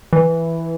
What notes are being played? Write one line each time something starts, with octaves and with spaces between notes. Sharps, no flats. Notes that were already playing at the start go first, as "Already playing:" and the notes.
E3